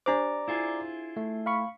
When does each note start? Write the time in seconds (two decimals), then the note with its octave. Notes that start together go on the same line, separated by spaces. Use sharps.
0.06 D4 G4 C5 D5 A#5 D6
0.48 E4 F4 G#4
1.17 A3
1.46 F5 B5 C#6